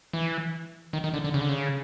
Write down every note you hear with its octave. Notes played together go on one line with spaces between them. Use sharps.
E3
D#3
D#3
D3
D3
C#3
D3
C#3